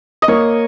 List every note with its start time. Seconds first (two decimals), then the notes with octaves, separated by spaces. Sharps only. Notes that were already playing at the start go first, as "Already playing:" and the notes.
0.22 D#5
0.28 A#3 C#5